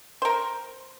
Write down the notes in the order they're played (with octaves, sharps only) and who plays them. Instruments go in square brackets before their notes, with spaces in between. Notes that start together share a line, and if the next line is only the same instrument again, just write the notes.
[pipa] A#4 C5